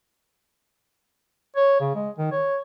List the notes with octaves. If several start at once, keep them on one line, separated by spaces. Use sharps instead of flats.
C#5
C#3
G#3
D#3
C#5